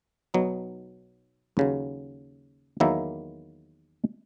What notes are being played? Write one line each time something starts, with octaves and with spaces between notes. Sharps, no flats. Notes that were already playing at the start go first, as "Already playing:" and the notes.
B1 B2 F#3 B3 D#4
D#2 C#3 F#3
E2 D#3 F#3 A#3 E4